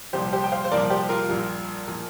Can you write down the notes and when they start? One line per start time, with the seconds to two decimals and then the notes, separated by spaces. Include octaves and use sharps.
0.13 C2 A#2 F3 G4 C5
0.33 G4 C5
0.44 G5
0.52 C5 F5
0.65 C5
0.71 C2 A#2 F3 A#4 D5
0.90 G4 C5
1.09 F4 A#4
1.28 A#1 A#2 G3
1.88 A#2 F3